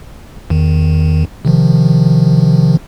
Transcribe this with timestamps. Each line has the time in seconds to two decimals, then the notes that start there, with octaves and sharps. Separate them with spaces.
0.50 E2 D#3
1.45 C3 D#3 F3